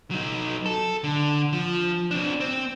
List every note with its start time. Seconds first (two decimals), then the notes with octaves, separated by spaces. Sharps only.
0.11 F#3 D#4
0.66 A4
1.04 D3
1.53 F3
2.11 C4 D4
2.40 C4